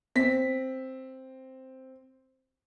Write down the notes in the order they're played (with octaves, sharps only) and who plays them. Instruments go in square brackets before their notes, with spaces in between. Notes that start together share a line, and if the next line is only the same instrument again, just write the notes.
[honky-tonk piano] C4 B6